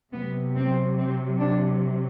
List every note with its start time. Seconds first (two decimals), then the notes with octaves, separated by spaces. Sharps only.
0.13 C3 F#3 B3
0.55 C4
0.97 C4
1.39 D4